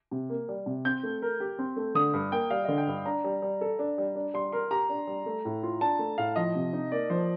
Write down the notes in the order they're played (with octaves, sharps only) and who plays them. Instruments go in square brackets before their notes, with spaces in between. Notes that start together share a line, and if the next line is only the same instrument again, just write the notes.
[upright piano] C3
A#3
G3
C3
[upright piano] C4 [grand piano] G6
[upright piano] A3
A#4
G4
C4
A3
[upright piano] D3 [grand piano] D#6
[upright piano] G2
[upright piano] A#3 [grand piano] G5
[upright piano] G3 [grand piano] F5
[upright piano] D3 [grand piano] D#5
[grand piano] G5
[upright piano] G2
[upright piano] D4 [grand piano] A#5
[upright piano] G3
G3
A4
D4
G3
D4
[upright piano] G3 [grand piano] C6
[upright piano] A#4 [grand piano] C6
[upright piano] G4 [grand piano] A#5
[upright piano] D4
G3
A3
A2
F4
[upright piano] D4 [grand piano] A5
[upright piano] A3
[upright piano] A2 [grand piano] F5
[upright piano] F3 [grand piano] D#5
[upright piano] C3
D#4
[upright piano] A#3 [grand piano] D5
[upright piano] F3 [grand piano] C5